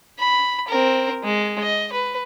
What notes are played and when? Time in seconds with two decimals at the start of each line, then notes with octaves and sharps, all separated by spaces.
0.19 B5
0.68 C4 A#4
1.24 G#3
1.63 D#5
1.93 B4